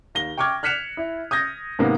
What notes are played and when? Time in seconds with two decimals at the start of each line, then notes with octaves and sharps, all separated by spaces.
0.15 D#2 A#6 G7
0.37 G5 C#6 D6 F6 G#6
0.63 F6 F#6 B6 C#7 E7 F7
0.97 E4
1.31 D#6 G6 G#6 A#6
1.79 G#2 C3 D#3 A#3 B3